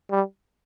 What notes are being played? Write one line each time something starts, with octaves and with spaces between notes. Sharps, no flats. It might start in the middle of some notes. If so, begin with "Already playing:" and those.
G3